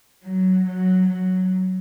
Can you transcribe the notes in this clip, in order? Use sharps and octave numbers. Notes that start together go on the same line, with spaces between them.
F#3
F#3
F#3